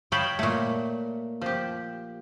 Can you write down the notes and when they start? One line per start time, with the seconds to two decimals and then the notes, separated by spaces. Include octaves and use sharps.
0.12 C#5 D#5 F5 G5 A5 B5
0.39 A#2 A3
1.41 F3 G4